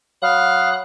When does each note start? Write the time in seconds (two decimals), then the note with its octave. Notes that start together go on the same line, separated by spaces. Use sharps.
0.22 F#3 F5 B5 D#6 F#6